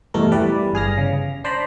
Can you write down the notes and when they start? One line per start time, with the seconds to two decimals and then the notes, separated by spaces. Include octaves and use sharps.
0.14 E2 G2 B2 A3 A#4
0.31 E3 G3 B4 D5
0.73 G1 G#4 F6 A#6
0.98 C#3
1.44 D4 C5 D5 A#5 B5